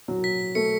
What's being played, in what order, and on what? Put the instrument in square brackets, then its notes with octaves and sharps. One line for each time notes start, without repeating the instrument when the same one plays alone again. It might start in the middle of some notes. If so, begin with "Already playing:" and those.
[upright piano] F#3
[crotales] B6
[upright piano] A3 [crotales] C#7